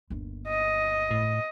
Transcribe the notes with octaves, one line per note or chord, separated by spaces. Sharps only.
G1 D#2
D#5
A2